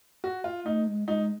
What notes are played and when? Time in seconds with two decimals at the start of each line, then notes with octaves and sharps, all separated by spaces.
0.24 F#4
0.44 F4
0.65 A3 D#4
0.87 G#3
1.08 G#3 D#4